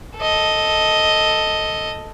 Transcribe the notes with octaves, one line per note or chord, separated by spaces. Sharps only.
A4 D#5